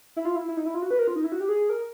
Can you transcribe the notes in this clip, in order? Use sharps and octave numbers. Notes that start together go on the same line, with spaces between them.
E4
F4
E4
E4
D#4
E4
F4
F#4
B4
A#4
F4
D#4
E4
F#4
G4
G#4
A#4